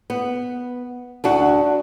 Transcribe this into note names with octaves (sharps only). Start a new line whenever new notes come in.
B3
D2 D4 F#4